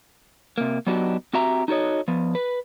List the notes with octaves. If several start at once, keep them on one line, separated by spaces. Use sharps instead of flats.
C3 A#3
F#3 B3 D4 D#4 F#4 G4
C4 F#4 G4 E5 A#5
D#4 F#4 A4 C#5 D#5
F3 B3
B4